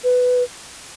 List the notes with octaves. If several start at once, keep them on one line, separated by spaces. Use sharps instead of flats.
B4